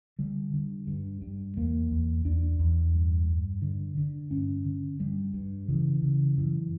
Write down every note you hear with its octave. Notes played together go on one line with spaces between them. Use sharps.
D3 G3
D3
G2
G2
E2 A#3
E2
E2 D4
E2
G2
G2
D3
D3
G2 C#4
D3
G2 G3
G2
C#3 E3
C#3
F#2 E3